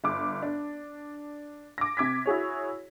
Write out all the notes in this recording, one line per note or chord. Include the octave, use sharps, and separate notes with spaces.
G1 D6
D4
D6 A#6
C3 D6 G#6 B6
E4 F#4 G#4 C#5